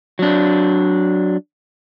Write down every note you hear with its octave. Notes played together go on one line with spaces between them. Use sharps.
F#3 D4